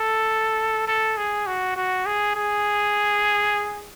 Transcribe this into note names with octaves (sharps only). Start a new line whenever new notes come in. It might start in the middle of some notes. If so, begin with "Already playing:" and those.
Already playing: A4
A4
G#4
F#4
F#4
G#4
G#4